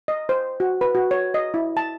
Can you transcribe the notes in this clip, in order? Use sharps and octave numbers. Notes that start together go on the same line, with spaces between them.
D#5
C5
F#4
B4
F#4
C#5
D#5
E4
A5